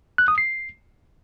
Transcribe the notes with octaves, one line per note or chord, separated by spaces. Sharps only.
F#6
D#6
C7